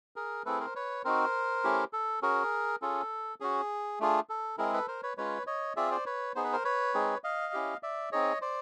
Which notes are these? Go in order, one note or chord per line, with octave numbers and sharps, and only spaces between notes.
G#4 A#4
A3 C4 E4 G#4 A4 B4
A#4 C5
B4 C#5
C4 D#4 F#4 A#4 C5
A3 C#4 E4 G4
A4
C#4 F#4 G#4 A#4
C#4 F4 G#4 A4
C#4 F#4 G#4
A3 D4 F4 G#4
A4
G#3 C4 E4 G#4 A#4
A4 B4
A#4 C5
B4 C#5
G#3 C#4 F4 B4 C#5
C#5 D#5
C4 F4 G#4 D5 E5
C5 D5
B4 C#5
B3 D#4 G#4 C5
B4
A#4 C5
B4 C#5
G#3 C4 D#4 G#4
D#5 F5
C#4 E4 G4
D5 E5
C4 D#4 G#4 C#5 D#5
C5 D5